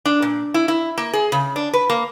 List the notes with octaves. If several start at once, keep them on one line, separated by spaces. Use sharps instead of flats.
D4
A#2
E4
E4
A#3
G#4
C#3
D4
B4
A#3